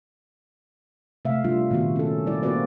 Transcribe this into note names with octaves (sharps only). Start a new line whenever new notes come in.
C3 A3 E5 F5
G3 D4 F4
A#2 D#3 A#3 B3 F#4
C#4 A4
G3 E4 D5
A#3 C4 F#4 B4 D5